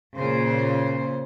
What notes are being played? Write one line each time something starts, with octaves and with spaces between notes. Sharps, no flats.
A#2 C#3 C5